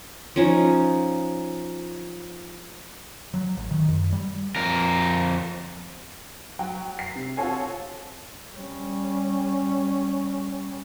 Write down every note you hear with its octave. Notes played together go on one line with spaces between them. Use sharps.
F3 C#4 D#4
F#3
A1
D#3
F#2
G3
F2 A#4
F#3 G5
C7
C3
C4 F4 F#4 A4 C#5 G#5
G3 C#4